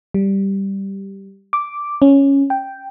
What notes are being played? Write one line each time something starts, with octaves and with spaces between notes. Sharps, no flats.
G3
D6
C#4
G5